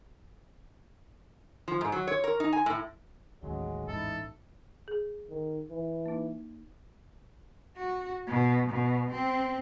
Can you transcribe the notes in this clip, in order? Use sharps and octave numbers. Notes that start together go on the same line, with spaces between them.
F3
G#2
F#3
C#5
A#4
D#4
G#5
A2
A1 D#2 C#3 F#3 G#3
G#1 E2 G#2 D#4 E4 A4
G#4
D#3
E3
A#3 D#4
F#4
B2
B2
C4